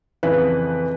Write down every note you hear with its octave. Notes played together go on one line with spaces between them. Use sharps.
F2 C#3 E3 B4